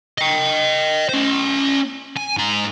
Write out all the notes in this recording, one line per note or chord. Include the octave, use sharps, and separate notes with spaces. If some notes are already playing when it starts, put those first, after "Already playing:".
D#5 G5
C#4 C5
G#5
G#2 A#5